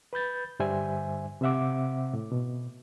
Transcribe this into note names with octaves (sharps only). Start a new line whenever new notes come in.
B4 B5 G6 A6
G2 D3 G3 C5 E5 G#5
C3 C4 C5 E5 F#5 D6
A2
B2